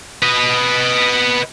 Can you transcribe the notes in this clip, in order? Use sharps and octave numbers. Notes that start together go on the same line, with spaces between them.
B4 D#5